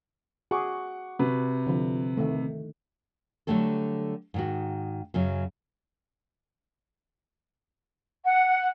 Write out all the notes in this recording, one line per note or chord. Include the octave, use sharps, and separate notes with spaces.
F#4 G#4 F#5 C#6 D6
C3 F#4 B4
D3 F3
D#3 A3
D3 F#3 G3 A3 C#4 A4
G#2 D#3 F#4
F#2 C#3 F#3
F#5